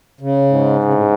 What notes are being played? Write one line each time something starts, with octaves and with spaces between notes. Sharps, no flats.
C#3
G#2
C#3
A2